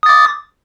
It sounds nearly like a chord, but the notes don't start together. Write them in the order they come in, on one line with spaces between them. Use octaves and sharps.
D#6 A6 D6